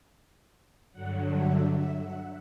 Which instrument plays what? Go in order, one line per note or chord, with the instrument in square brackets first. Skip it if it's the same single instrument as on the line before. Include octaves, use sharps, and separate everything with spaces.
[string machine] G2 D3 F#3 F#5
E5
E5
F#5